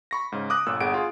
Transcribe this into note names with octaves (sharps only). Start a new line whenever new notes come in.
B5 C#6 A#6
G#2 C#3
D6 D#6 F#6 A#6
G1 A#2 E6 F#6
G1 G#4 F#5 D7
F4 G#4